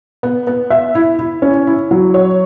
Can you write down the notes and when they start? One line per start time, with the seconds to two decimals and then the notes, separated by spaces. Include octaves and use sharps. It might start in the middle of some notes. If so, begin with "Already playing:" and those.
0.23 B3
0.47 B3
0.70 E5
0.95 E4
1.19 E4
1.42 C#4
1.67 E4
1.91 F#3
2.14 C#5